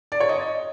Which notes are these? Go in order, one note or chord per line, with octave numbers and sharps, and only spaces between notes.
D5
C#5
D#5